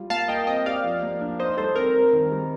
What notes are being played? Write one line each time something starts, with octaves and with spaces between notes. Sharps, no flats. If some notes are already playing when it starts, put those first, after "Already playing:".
Already playing: G3 F4
A#3 F5 A5
A#4 D#5 G5
C4 D#5 G5
G4 D5 F5
F3
A#3
D4
D#4 C5 D#5
G3 A4 C5
C4 A#4
C4
D#3
G3